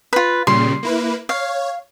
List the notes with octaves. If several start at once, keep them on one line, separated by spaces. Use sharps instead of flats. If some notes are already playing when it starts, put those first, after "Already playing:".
F4 B4
A#2 C#3 G3 C6
A#3 E4 B4
C#5 F5